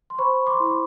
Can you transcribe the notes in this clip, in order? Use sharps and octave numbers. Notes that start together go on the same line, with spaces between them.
C6
C5 B5 C#6
C6 D6
E4
D6